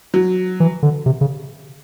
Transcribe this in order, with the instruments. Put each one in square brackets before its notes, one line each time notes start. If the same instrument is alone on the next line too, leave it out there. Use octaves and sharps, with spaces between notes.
[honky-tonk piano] F#3
[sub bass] E3
D3
C3
C#3